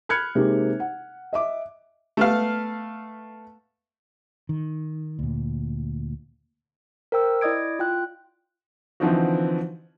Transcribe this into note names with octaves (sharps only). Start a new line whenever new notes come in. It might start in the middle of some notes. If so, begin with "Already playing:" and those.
B5 F6 F#6 G#6 C#7
C3 G#3 A#3 C4 D#4 G4
F#5
D#5 E5 D6
A3 B3 F5
D#3
D2 A#2
A#4 C5 G5 E6
E4 D5 D#5 D#6 G#6 D7
F4 G5 F#6
D3 E3 F3 C4 D#4 F#4